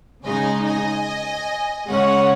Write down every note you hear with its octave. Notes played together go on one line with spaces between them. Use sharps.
C#3 G#3 D#4 D#5 G#5
D#5 G#5
C#3 G#3 C#4 C#5 F#5